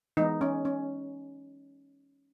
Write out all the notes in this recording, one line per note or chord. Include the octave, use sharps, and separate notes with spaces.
E3 G#3 B3 D#4
C#4
C#4